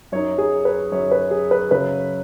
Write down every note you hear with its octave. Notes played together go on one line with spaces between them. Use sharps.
F#2 F#3 D#4 C#5
G#4
B4
F#2 F#3 D#4 C#5
B4
G#4
B4
F#2 C#3 F#3 B4